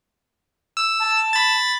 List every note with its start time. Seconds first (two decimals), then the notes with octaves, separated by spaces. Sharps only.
0.77 E6
1.00 A5
1.33 B5 A6